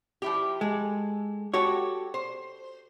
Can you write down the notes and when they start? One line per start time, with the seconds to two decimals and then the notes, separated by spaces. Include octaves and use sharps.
0.22 F3 E4 G4
0.61 G#3 A4
1.54 F#4 G4 A4 C#5
2.14 C5